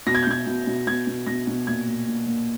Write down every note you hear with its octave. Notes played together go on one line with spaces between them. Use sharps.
B2 A#6
G#6
G6
B2 G#6
B2
B2
B2 G#6
B2
B2 A#6
B2
A#2 G#6
A#2
A#2
A#2